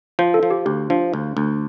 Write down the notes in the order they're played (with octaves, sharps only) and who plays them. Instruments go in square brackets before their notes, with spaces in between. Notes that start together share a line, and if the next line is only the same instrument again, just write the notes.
[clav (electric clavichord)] F3 [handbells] C5
[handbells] A4
[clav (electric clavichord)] F3
[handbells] G4
[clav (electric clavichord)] D2 [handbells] G4
[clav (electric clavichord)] F3 [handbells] D4
[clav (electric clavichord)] D2
D2